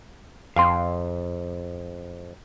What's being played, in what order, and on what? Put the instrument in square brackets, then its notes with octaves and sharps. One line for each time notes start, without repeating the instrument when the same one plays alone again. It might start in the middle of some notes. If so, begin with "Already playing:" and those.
[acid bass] F2 [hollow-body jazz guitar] F5 G5 C6